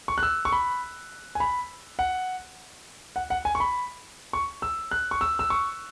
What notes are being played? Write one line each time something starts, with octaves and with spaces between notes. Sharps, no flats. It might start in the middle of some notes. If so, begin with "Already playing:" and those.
C#6
F#6
E6
C#6
B5
G#5
B5
F#5
F#5
F#5
G#5
C#6
B5
C#6
E6
F#6
C#6
E6
E6
C#6